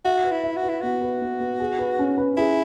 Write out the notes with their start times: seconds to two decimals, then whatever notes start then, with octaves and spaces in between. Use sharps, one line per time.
0.05 F#4 E5
0.24 B4
0.31 E4
0.44 E5
0.57 F#4
0.63 B4
0.69 E4
0.81 B3 F#4
1.01 B4
1.22 B3
1.40 B3
1.60 G#4
1.79 B4
1.99 C#4
2.18 B4
2.37 E4 G#4